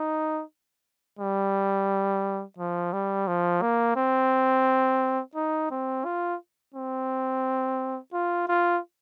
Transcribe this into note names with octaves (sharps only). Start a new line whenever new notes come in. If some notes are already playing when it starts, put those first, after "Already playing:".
Already playing: D#4
G3
F3
G3
F3
A#3
C4
D#4
C4
F4
C4
F4
F4